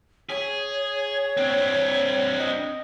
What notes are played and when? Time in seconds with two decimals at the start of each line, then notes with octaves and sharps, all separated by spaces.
0.30 G#4 C#5
1.37 C4 D4
2.39 D#5